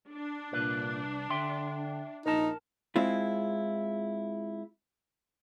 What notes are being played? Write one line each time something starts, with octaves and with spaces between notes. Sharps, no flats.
D4
C2 A#2 B4
D3 E5 G5 C6
A#1 D#4 A#4 A5
G#3 C4 E4 F4